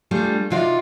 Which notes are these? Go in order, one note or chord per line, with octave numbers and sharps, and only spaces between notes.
G3 A3 D4 F4 G#4
C3 D#4 F4 F#4 C#5 D5